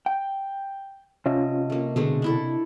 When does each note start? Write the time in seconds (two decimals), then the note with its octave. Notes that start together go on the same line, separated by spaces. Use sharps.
0.06 G5
1.26 C3 C#4 F4 D#5
1.70 A3 A#3
1.96 B2 D3 G#3 A3
2.22 D4 E4 A4